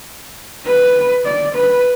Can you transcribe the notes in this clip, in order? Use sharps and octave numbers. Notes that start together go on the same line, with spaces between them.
B4
D5
B4